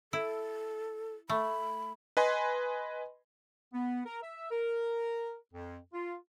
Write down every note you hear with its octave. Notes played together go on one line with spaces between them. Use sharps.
E4 A4
A3 B5
B4 D#5 G#5 B5 C6
B3
A#4
E5
A#4
F2
F4